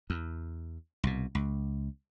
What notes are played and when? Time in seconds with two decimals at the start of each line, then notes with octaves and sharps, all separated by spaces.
0.10 E2
1.04 C2 B2
1.35 C#2